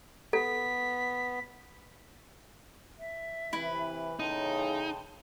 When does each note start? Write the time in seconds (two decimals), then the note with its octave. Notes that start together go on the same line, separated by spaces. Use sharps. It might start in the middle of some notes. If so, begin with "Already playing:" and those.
0.33 B3 A4 B6
3.01 E5
3.53 C3 E3 E4 B4
4.19 E2 A2 C#3 D#4 G5 A5 C6